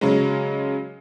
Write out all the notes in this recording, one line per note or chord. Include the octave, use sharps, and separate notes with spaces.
C#3 F#3 G#3